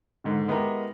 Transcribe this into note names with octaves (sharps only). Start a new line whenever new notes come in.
G#2 D3 D#3
G#3 B3 E4 G4 A#4